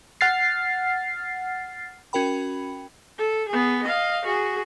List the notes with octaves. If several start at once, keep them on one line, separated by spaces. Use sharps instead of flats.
F#5 F6 A6 C7
C#4 F#4 A#4 G5 B5
A4
B3 G#4
D#5 F5
F#4 G#4